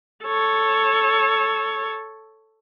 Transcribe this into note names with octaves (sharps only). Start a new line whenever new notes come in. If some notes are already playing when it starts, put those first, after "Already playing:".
A4 C#5